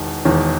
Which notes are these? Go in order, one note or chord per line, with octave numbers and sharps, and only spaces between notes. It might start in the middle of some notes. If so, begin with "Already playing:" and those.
Already playing: E1 E2 D#3
E1 E2 D#3